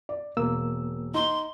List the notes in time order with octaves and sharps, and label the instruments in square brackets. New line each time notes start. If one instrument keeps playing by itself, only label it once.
[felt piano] D5
[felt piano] E1 [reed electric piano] A#3 E6
[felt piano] D#4 [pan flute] C6